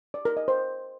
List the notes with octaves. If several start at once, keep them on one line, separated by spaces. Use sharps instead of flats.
D5
A#4
D#5
C5